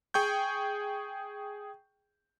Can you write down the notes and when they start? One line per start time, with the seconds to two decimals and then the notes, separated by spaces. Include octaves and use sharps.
0.14 G#4 G5 C#6 G6